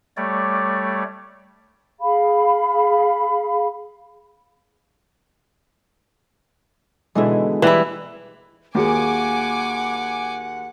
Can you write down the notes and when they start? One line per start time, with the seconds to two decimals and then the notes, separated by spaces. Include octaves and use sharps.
0.17 G3 A3 C#5 D5
2.00 G#4 F5 B5
7.15 B2 D3 E3 G#3 E4
7.62 E3 G3 C4 E4 G5
8.75 D#2 A#3 F#4 G#4 F#5 G#5 D6